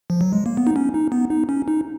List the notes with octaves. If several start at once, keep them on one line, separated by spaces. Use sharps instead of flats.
F3
F#3
G#3
A#3
B3
D#4
C#4
D#4
B3
D#4
C#4
D#4